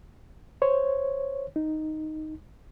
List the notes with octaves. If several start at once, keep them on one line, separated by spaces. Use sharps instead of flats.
C5 C#5
D#4